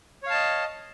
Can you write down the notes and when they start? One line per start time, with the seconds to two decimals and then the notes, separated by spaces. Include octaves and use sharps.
0.23 C#5
0.26 F5
0.30 A5
0.34 D#5